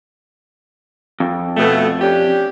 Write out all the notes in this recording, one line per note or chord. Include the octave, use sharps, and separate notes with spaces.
F2
B2 A3
C#4 D4 G4